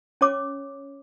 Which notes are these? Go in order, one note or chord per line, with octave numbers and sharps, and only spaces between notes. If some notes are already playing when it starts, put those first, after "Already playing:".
C#4 C#5 D6